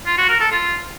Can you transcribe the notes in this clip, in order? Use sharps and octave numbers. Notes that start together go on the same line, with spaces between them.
F4
F#4
A#4
A4
F4